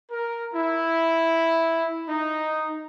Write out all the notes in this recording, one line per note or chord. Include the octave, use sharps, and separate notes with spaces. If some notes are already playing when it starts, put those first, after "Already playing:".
A#4
E4
D#4